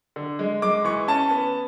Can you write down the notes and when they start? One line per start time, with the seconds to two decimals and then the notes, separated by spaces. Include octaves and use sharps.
0.16 D3
0.39 G#3
0.62 G#3 D6
0.85 E3 C#6
1.08 C#4 A5
1.30 B3